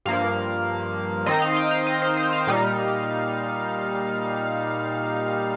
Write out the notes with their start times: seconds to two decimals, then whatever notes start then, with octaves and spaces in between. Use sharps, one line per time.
0.05 G2 F3 A#3 F5
1.26 D#3 C4 D#4 D#5
1.42 F5
1.56 G5
1.71 F5
1.87 D#5
2.02 C5
2.17 C5
2.33 F5
2.47 A#2 G3 D#4